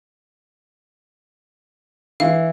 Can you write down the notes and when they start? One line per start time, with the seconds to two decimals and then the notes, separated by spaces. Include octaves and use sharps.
2.20 E3 F5